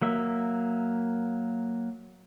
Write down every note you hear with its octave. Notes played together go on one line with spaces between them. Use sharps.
F#3 A#3 E5